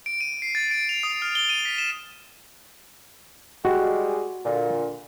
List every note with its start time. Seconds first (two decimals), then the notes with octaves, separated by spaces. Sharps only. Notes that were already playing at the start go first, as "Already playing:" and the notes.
0.06 D7
0.21 D#7
0.42 C7
0.55 A6
0.71 D7
0.89 F7
1.03 D#6
1.22 F6
1.35 G7
1.49 D#7
1.65 B6
1.78 E7
3.65 G3 G#3 F#4
4.45 A#2 D3